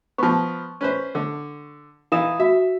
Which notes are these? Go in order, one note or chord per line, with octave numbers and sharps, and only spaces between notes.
F3 B3 C#6
C#4 B4 C5
D3
E3 D#4 F5 D#6 E7
F#4 E5